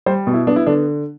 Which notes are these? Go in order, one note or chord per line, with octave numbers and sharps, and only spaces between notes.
G3 C5
B2
E4
B3 D4
E4
D3 D4